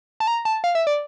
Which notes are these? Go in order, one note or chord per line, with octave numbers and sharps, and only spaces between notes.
A5
A#5
A5
F5
E5
D5